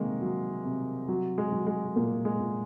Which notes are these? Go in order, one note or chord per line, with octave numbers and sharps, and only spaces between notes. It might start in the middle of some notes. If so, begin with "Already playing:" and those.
Already playing: C3 D#3 G#3 A#3
F#3
C3
F#3
G#3
F#3
G#3
A#2 A#3
G#3
A#2